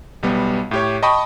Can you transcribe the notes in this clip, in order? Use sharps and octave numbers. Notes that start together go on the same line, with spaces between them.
B1 G3 B3
A2 G4 C#5
D#5 G5 A5 B5 C#6 D#6